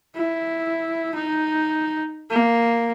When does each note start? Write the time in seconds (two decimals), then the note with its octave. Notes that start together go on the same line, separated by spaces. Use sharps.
0.15 E4
1.15 D#4
2.30 A#3